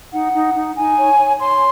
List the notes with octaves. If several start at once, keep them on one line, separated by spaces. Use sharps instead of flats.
D#4 F#5
D#4
D#4
D#4 G#5
C#5
C#5
C#5 C6